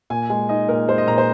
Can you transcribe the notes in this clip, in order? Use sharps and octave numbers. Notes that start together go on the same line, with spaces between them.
A#2 G#5
G#3 G#5
D#4 D#5
A#2 A#4
G#3 C5
D#5
A#2 A#5
C5